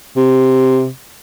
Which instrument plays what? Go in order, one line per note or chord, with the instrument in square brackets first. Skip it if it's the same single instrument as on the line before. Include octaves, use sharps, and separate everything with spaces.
[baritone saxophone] C3